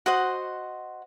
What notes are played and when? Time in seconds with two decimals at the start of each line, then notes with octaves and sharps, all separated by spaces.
0.06 F#4 C5 D#5 F#5